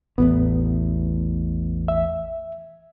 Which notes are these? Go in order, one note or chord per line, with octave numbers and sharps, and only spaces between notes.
A1 E2 A2 B3
E5